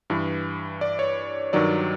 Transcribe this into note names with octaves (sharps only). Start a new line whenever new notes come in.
G2 E3
D5
C#5
G2 D#3 F#3 D5